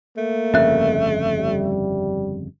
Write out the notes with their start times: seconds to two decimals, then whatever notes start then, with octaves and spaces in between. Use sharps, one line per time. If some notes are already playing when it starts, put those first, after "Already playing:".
0.17 A3 A#3
0.54 G1 F2 C#3 E5 F#6
1.37 G3